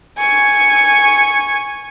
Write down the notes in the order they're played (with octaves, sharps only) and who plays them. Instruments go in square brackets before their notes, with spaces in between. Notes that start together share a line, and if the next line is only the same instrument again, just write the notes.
[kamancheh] G#5 C#6